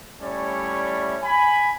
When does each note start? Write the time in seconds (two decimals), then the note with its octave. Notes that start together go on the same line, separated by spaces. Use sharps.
0.20 G3 A3 C#4 E4 C#5 D5
1.22 G#5 B5